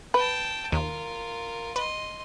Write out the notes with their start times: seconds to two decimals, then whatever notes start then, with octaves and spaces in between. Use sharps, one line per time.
0.14 B4 G5 A5
0.72 D#2 F4 A#4
1.76 B4 D#5 C6